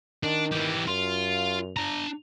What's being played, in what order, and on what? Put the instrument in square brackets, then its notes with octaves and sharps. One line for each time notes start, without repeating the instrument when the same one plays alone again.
[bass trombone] D#3 [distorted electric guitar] D4
[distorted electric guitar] E3 G4
[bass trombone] F#2 [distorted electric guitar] F4
[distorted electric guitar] D4 A#5